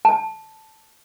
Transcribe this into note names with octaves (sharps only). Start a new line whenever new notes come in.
A5